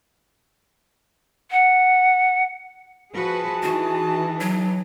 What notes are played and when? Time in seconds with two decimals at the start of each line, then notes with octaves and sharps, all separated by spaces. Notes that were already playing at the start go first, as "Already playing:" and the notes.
1.51 F#5
3.15 F3 F#4 G#4 B4 A5
3.63 E3 D#4 F#4
4.41 F#3